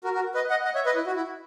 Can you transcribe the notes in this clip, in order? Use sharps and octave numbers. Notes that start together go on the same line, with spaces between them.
F#4 A#4
F#4 A#4
B4 D#5
D#5 F#5
D#5 F#5
C#5 E5
B4 D#5
E4
F#4
E4